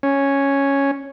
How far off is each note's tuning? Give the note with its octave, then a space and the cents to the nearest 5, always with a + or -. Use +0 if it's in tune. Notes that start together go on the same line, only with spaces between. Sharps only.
C#4 +0